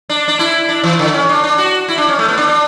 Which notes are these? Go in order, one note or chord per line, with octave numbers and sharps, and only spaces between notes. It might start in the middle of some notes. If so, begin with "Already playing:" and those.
D4
D4
E4
D4
E3
D3
C#4
D4
D4
F#4
E4
D4
C#4
A3
B3
D4
D4